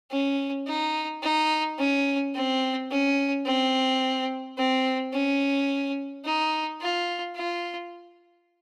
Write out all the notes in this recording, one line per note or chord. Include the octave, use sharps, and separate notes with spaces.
C#4
D#4
D#4
C#4
C4
C#4
C4
C4
C#4
D#4
F4
F4